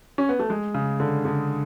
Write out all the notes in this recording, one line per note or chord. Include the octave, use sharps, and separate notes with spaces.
C#4
B3
A3
G#3
C#3
D3
D3